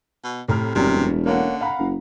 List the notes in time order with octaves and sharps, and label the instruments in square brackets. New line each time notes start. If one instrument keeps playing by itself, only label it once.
[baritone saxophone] B2
[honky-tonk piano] A2 A#5 F6 [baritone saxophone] C3
[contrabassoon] E1 [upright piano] F#2 [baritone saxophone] C3 [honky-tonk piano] G3
[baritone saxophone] D3 [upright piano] A#3 C#4 F#5
[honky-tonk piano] F5 A#5 [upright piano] F#5 B5
[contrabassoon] F#1